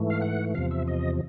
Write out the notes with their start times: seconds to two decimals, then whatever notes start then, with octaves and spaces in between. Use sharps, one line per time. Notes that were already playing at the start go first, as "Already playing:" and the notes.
Already playing: G#2 E3 A3
0.10 F5
0.22 F#5
0.54 E2 C3 F3 F5
0.71 E5
0.87 D#5